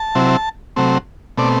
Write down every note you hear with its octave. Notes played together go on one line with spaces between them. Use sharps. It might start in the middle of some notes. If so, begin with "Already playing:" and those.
Already playing: A5
C3 F#3 C4 E4
C3 F#3 A3 C4
B2 A3 C4 D5